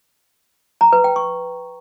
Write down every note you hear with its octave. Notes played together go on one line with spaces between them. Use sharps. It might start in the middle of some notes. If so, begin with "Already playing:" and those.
A#5
B4
G5
C#6